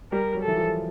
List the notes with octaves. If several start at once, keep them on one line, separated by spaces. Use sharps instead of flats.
G3 A#4
F#3
A4
E3
F3